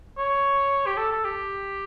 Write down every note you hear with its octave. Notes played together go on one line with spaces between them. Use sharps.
C#5
G4
A4
A4
G4